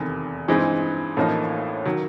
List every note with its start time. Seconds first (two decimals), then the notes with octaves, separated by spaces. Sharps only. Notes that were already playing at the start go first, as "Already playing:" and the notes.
Already playing: F1 E2 C3 D#3
0.48 G2 E3 G#3 C4 D#4
1.17 A1 A2 F3 A#3 D#4
1.86 D#3 F#3